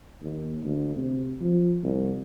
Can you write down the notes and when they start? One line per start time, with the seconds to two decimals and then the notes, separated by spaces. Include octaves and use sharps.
0.22 D#2
0.63 D2
0.97 C3
1.41 F3
1.84 C2